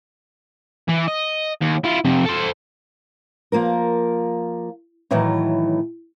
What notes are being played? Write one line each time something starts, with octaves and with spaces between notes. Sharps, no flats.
E3
D#5
D#2
E4 F4
F2 C3
A4 C5
F3 A#3 F4 A#4
A2 D#3 E3 F#3 A3